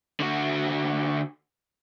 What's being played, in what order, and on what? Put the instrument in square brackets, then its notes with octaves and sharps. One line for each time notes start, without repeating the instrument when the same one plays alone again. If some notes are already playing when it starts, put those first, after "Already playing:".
[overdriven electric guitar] D3 F#4